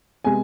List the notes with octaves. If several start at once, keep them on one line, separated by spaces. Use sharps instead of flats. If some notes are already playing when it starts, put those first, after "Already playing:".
C3 G#3 B3 G#5